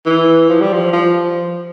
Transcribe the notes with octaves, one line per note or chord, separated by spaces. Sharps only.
E3
F3
G3
F3
F3